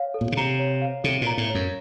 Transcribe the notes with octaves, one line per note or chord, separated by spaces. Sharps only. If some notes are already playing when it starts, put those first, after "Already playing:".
Already playing: C#5 F5
A4
A#2
C#3
C3 A#5
C#5
F5
C3 A4
A#2
A#5
A2
F#2 C#5